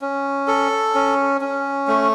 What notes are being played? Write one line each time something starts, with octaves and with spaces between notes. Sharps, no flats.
C#4
A4
C#4
C#4
A3